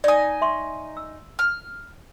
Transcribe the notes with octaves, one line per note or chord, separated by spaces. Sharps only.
D#4 D5 G#5 D#6
E5 C6 C#6
E6
F6